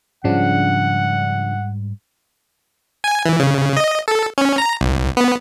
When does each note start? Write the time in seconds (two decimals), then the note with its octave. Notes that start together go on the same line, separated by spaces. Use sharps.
0.24 G#2 C#3 F3 G3 D4 F#5
3.04 G#5
3.25 E3
3.40 C#3
3.76 D#5
4.08 A4
4.38 C#4
4.58 A#5
4.81 C2
5.17 B3